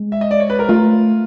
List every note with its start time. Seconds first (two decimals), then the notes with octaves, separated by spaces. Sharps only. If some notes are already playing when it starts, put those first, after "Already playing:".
Already playing: G#3
0.12 E5
0.21 D#5
0.31 D5
0.40 C#5
0.50 B4
0.59 A#4
0.69 A3 F4